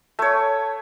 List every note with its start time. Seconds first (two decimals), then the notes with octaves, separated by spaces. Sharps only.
0.19 A3 C#5